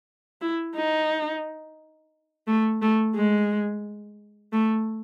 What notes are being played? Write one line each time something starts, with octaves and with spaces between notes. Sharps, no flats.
E4
D#4
A3
A3
G#3
A3